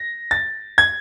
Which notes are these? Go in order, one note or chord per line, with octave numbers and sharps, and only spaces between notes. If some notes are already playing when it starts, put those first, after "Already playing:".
Already playing: A#6
A6
G#6